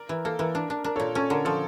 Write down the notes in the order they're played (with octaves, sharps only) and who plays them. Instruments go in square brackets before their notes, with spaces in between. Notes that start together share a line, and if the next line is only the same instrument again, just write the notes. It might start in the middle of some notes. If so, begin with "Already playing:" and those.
Already playing: [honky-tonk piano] A#4 [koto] D5
[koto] E3
[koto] A#3 [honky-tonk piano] A4
[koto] E3 [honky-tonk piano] A#4
[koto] D4
D4
[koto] D4 [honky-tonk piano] A#4
[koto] A#2 [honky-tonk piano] A4 C#5
[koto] C#4 [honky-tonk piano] A4 C#5
[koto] D3 [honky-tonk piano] A#4
[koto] F3 [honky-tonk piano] A4